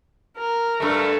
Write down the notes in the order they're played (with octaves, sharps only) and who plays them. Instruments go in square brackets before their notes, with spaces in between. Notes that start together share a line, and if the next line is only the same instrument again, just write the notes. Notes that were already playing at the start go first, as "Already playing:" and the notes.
[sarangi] A#4
[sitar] G2 A3